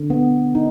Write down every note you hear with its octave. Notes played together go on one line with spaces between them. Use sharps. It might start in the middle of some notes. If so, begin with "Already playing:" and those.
Already playing: D3
B3
D#4